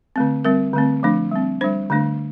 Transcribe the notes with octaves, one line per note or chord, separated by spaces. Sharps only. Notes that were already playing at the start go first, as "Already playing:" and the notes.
D3 A3 C4
G3 C4 A#4
D3 A3 C4
F3 A3 D4
G3 C4
G3 D4 C5
D3 A3 D4